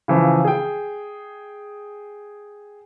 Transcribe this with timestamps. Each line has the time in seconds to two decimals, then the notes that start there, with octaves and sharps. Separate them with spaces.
0.08 C#3 E3 F3
0.45 G#4 G5